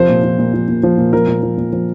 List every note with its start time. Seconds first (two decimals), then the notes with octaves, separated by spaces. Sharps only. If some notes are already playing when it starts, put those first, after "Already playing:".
Already playing: C3 F3 C5
0.09 A#2
0.24 F3
0.39 A#2
0.54 F3
0.68 A#2
0.83 F3
0.98 A#2
1.13 F3 A#4
1.28 A#2
1.43 F3
1.58 A#2
1.72 F3